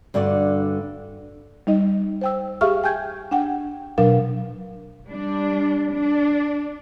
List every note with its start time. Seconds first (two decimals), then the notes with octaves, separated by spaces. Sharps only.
0.14 G2 D3 F#4 D5
1.67 G3 D#4 D#5
2.21 C5 G5 E6
2.61 G4 G#4 E5 F5 C#6 F6
2.84 G5 G#5 G6 G#6
3.31 D4 F#5 G5
3.98 B2 F#3 D4 A#4 F5
5.07 G3 D4
5.93 D4